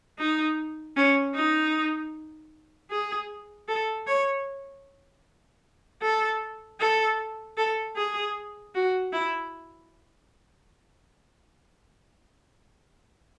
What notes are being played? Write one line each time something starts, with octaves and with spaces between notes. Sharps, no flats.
D#4
C#4
D#4
G#4
A4
C#5
A4
A4
A4
G#4
F#4
E4